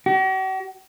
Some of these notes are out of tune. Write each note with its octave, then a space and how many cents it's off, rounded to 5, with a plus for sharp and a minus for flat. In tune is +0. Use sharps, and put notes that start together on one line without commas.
F#4 +45